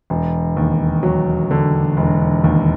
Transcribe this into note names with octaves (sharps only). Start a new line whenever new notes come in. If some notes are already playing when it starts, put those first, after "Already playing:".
E1
D#2
F#3
D3
E1
D#2